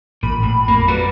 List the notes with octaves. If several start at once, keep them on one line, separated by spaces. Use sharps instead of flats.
A1 A#2 B5
A2
F2 A#3
G3 F#4 B4